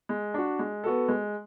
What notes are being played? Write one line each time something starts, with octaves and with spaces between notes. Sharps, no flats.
G#3
D4 F#4
G#3
B3 F#4 A4
G#3